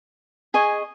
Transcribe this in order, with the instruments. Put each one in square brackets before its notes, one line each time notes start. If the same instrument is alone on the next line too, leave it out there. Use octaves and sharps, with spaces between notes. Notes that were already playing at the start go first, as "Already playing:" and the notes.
[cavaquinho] G#4 D#5 G#5 C#6